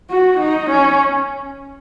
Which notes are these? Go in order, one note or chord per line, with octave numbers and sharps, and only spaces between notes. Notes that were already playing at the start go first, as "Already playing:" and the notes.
F#4
D#4
C#4